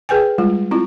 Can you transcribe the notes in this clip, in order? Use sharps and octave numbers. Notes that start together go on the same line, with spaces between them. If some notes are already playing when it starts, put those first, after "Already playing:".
G#4 B4 G5 G#5
G3 G#3 F4
C4 E4 F4